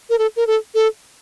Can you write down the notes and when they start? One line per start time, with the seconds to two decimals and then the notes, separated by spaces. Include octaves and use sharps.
0.10 A#4
0.19 A4
0.36 A#4
0.47 A4
0.75 A4